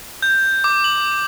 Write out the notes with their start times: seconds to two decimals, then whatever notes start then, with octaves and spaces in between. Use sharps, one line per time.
0.22 G6
0.64 D6
0.84 F#7